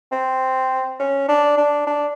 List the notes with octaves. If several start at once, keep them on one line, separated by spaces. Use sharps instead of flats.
C4
C#4
D4
D4
D4